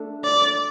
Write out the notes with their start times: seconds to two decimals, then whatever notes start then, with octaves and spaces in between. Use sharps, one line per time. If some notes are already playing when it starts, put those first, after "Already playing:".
Already playing: A3 D4
0.24 D5